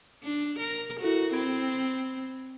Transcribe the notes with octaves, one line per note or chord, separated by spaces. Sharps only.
D4
A#4
E4 F#4 A4 A#4
C4 B5 G#6 D7